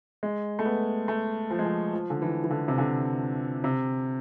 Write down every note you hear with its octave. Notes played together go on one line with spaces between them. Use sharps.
G#3
A3
B3
A3
F3
G#3
F3
F3
D3
E3
E3
D3
C3
D3
C3